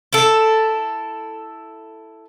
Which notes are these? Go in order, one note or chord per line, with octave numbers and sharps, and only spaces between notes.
E4 A4